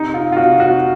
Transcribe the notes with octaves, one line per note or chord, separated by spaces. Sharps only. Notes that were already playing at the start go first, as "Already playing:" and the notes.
Already playing: C3 D#4
F4
F4
C3 F#4
F#4